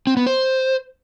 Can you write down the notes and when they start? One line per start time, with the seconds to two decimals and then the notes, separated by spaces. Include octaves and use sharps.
0.07 C4
0.17 B3
0.26 C5